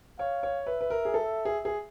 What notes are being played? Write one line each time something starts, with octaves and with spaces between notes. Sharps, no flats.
C#5 F5
C#5
B4 E5
B4
A#4
G#4
A4
G#4
G#4